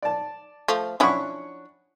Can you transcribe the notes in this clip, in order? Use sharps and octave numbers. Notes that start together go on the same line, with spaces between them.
D5 A5
F3 A3
F3 C#4 D4 E4 F#5 C#6